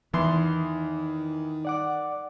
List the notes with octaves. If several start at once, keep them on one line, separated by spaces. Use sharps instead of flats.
E2 D#3 E3 C6
D5 F#5 D6